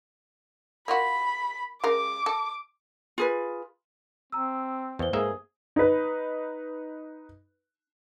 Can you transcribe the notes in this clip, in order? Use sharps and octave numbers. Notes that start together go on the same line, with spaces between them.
A#3 F4 F#4 B5
C#3 G#3 A#4 D6
A4
F4 G#4 B4
C4 A#5 E6
E2 B4 C5 G7
G#2 A#3 G#4 E5
D#4 B4